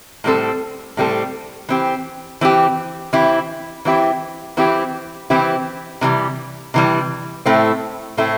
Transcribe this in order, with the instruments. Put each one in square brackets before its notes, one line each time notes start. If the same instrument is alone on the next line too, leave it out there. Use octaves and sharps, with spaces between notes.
[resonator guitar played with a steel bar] A2 G3 C4 A4
A2 G3 C4 A4
E3 C4 G4
E3 C4 G4
E3 C4 E4 G4
E3 C4 E4 G4
E3 C4 E4 G4
E3 C4 E4 G4
C3 E3 G3
C3 E3 G3
A2 A3 C4 E4
A2 A3 C4 E4